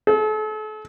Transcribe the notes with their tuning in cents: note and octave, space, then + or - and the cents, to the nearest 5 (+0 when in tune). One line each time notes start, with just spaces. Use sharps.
A4 -40